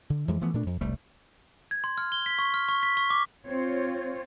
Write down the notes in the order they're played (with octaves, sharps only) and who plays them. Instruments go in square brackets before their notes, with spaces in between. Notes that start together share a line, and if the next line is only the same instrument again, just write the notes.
[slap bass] D3
F2 E3 G#3
E3 F3 A3 B3
A#2 A3 D4
F2
E1 C2 G3 A3
[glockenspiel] G#6
C6
F6
G7
B6
C#6
F6
C#6
B6
C#6
D6
[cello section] C4 F4 C5 C#5